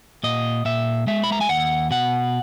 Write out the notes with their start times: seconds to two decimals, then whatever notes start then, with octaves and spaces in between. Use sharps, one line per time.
0.23 A#2 D#5
0.65 A#2 E5
1.07 G#3 E5
1.24 B5
1.32 A#5
1.41 G#5
1.49 D#2 F#5
1.91 B2 F#5